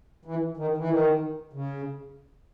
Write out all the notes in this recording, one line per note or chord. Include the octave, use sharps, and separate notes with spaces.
E3
D#3
E3
D#3
C#3